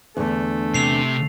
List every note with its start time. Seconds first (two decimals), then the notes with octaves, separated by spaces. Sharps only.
0.17 E2 D3 A3
0.74 C3 C7 F7